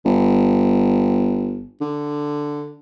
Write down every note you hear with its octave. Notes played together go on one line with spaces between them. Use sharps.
G1
D3